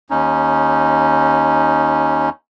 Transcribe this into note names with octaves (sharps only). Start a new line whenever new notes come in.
D#2 C#4 D#4